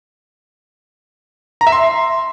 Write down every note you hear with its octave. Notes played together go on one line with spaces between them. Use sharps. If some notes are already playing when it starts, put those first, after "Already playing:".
A#5
E5
C6